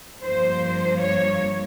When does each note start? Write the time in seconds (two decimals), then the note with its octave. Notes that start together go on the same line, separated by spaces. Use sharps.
0.23 G2 F3 A#3 C5
1.00 C#5